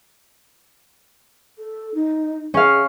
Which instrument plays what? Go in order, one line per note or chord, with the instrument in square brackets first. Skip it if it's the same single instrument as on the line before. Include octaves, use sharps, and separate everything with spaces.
[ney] A4
D#4
[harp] C#4 F5 [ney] G#4